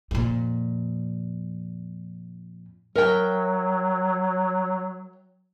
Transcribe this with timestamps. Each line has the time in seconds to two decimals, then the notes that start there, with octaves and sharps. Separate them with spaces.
0.11 F2 A#2
2.95 F#3 A#4 E5 G5